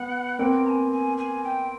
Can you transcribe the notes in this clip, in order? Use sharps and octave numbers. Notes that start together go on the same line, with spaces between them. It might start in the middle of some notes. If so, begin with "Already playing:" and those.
Already playing: B3 F#5
A#3 C4 G5
A#5
G#5
G#5
G#5
G5